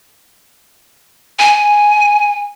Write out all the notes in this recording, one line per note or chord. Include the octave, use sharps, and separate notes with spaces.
G#5